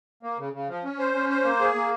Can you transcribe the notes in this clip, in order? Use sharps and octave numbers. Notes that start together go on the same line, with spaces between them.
A#3
C#3
C#3
F3
C#4
C5
C#4
C5
A#3
G#4
A#3